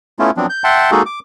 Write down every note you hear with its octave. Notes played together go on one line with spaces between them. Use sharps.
A3 B3 C#4 E4 F4
F3 F#3 B3 C4 D4
G6
E5 F#5 G5 A5 C6
G#3 A#3 D#4 F#4 G#4 A4
D6